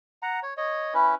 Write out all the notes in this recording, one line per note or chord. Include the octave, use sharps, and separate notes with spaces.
F#5 A#5
C#5
C#5 D#5
C#4 E4 B4